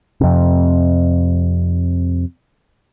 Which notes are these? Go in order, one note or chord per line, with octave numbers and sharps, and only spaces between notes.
F2 C3